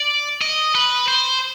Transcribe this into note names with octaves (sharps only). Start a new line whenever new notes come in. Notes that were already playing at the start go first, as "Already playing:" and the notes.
Already playing: D5
D#5
B4
C5